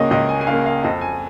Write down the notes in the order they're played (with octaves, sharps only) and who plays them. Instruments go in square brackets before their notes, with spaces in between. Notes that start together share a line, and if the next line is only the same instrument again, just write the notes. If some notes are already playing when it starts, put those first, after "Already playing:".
Already playing: [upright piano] C#2 C#3 A#3 C#5 D#5
C#2 D#5
G#5
G#5
C#3 A#3 F5
F5
F2 D#5
G#5